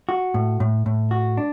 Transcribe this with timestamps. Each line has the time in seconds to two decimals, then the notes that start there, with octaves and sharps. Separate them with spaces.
0.09 F#4
0.34 A2
0.60 A2
0.86 A2
1.11 F#4
1.37 D4